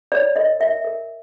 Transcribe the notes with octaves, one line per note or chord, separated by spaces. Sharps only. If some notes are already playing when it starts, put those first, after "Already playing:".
C#5 D5
A#4 D#5
A#4 E5
A#4